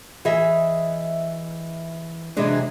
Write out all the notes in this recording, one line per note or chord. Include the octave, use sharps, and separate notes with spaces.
E3 G#4 D#5 E5
C3 E3 F#3 G#3 D4